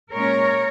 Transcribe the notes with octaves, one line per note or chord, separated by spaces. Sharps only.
A#2 G#3 C#4 A#4 C#5